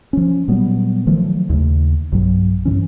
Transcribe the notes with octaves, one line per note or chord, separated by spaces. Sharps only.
F3 C#4
A#2 F#3 G3 B3
D#3 F3 F#3 A3
D#2 C#3 A3
B1 G2 F#3
G2 E3 C#4